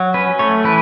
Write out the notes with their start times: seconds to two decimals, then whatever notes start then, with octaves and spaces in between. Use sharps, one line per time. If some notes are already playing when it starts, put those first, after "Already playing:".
Already playing: F#3
0.14 C#4 B4
0.39 A3 C#5
0.64 E3 B4